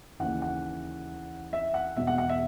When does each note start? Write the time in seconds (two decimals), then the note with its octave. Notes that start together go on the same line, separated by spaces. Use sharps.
0.19 D#2 C#3 E3 F#5
0.42 F#5
1.53 E5
1.74 F#5
1.96 E1 E2 B2 E5
2.07 F#5
2.18 F#5
2.29 E5